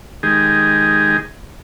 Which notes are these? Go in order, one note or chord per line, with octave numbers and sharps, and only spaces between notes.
D#3 G#3 D#4 G4 G#4